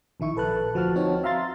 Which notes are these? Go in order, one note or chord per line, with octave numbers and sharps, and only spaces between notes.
A#1 D#3 E4 C#6
A#1 A4 B4 A5 F#6
D2 F3 F#4 A5 F6
C4 D#4 F#4 C#5
E5 F5 A#5 C6 A6